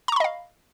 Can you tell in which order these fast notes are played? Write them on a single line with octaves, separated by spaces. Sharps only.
A#5 C#6 B5 D#5 F5